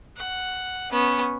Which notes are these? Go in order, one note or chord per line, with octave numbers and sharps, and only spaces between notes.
F#5
B3 C#4